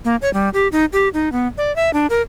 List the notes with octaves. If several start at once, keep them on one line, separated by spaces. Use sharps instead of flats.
A#3
C#5
G3
G4
D#4
G4
D#4
B3
D5
E5
D4
A#4